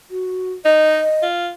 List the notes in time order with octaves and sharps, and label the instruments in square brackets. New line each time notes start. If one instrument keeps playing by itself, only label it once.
[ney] F#4
[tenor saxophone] D#4 [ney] D#5
[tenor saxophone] F4